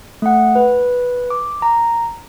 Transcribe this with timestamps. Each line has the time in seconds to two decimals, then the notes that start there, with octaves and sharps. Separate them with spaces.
0.22 A3 F#5
0.55 B4
1.30 D6
1.62 A#5